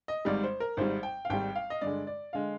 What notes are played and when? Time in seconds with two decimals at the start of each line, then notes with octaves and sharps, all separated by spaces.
0.08 D#5
0.25 G#1 G#2 G3 D5
0.44 C5
0.60 A#4
0.77 G#1 G#2 G3 C5
1.03 G5
1.25 F5
1.30 G#1 G#2 G3 G5
1.56 F5
1.70 D#5
1.81 G2 D3 G#3 D5
2.07 D5
2.33 D3 G#3 F5